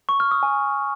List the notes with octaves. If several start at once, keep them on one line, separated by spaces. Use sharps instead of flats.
C#6
F6
D#6
G#5